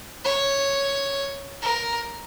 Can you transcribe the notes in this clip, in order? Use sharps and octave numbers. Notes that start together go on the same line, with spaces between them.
C#5
A#4